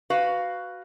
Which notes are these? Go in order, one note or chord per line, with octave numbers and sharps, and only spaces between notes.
F#4 B4 F5